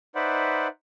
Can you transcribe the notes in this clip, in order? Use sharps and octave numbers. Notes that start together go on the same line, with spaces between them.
D#4 B4 C5 D5 E5 F#5